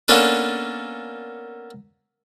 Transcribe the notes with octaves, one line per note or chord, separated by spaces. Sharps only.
A#3 B3 C#4 D4 A4 B4